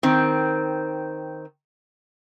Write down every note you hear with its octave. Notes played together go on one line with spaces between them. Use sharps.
D#3 C4